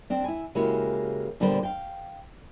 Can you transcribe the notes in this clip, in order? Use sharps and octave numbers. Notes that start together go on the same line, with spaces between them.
C4 D4
E4 G#5
C#3 G#3 A#3 E4 F#4 G4
A#2 D3 G3 B3 D4 C5
F5 G5